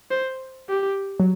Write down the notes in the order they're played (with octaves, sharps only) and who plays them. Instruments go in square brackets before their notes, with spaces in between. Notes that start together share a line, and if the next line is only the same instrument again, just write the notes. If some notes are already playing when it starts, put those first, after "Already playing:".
[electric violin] C5
G4
[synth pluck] F#3